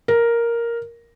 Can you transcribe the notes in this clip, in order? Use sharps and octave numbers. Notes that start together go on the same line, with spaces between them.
A#4